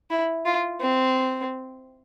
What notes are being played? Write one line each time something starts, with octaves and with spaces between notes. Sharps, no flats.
E4
F4
C4